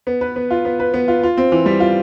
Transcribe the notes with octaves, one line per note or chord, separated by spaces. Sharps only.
B3
B4
B3
F4
B3
B4
B3
F4
F4
C4
E3
G3
F4